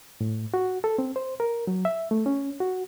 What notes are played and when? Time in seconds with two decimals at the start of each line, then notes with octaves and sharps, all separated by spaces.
0.21 A2
0.54 F#4
0.84 A4
0.99 C4
1.16 C5
1.40 A#4
1.67 F#3
1.85 E5
2.11 A3
2.26 C#4
2.60 F#4